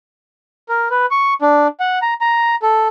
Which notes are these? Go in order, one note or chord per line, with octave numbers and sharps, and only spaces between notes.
A#4
B4
C#6
D4
F#5
A#5
A#5
A4